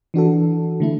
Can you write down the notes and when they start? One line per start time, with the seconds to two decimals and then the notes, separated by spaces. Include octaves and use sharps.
0.14 E3 D4 F#4 A4
0.80 D3 A3 E4